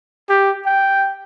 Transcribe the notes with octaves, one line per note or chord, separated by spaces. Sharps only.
G4
G5